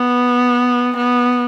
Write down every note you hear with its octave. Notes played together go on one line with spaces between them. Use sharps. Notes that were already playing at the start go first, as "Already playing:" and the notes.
Already playing: B3
B3